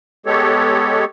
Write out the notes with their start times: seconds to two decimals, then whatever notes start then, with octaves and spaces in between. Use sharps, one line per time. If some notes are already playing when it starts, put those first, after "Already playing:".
0.26 G#3 B3 G4 A4 C#5